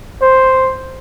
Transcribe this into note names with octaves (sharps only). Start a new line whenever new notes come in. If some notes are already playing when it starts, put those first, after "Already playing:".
C5